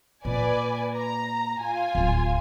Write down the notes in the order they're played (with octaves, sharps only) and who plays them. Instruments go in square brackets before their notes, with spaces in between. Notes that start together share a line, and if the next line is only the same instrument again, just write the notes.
[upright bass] A#2 [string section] B4 D5 G#5
[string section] A#5
F4 G#5
[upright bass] D1